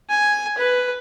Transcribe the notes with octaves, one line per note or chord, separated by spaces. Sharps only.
G#5
B4